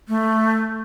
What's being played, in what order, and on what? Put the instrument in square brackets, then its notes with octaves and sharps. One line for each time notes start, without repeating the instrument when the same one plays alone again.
[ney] A3